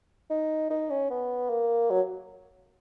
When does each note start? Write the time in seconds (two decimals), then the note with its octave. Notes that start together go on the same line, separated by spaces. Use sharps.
0.30 D#4
0.70 D#4
0.90 C#4
1.10 B3
1.50 A#3
1.90 F#3